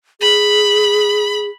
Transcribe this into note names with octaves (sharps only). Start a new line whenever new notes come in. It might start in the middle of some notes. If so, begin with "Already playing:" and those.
G#4 B5